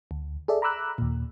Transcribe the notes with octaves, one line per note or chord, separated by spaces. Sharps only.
D2
G#4 A4 D5 E5
A#5 B5 D6 E6 F#6
D#2 A#2